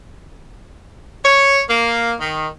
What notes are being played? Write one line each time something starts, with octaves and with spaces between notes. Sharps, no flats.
C#5
A#3
D#3